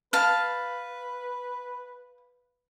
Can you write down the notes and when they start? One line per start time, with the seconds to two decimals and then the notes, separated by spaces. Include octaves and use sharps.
0.13 B4 F5 A5